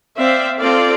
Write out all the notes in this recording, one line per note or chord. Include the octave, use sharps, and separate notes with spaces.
C4 C5 D5 E5 F5
C4 F4 A4 D5 F5